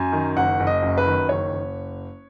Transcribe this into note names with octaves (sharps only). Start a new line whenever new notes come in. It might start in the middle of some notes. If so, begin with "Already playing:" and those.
Already playing: F#2 G#5
D#3
F#1 F#5
F#1
D#5
F#2
B4
D#3
F#1 C#5
F#1